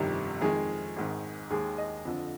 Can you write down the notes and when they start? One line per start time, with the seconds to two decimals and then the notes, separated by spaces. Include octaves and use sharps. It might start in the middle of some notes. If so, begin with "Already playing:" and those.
Already playing: G1 F2 C3 D#3 G3
0.41 F2 D#3 G#3 G#4
0.96 G#1 G#2 D#3
1.50 D#2 D#3 G#3 G#4
1.78 D#5
2.05 F2 D3 F3